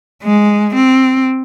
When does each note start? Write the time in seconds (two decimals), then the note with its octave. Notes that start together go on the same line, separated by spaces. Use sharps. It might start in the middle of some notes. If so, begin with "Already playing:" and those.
0.24 G#3
0.75 C4